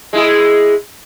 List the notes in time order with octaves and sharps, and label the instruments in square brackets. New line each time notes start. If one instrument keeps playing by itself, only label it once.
[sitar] G#3 E4 G#4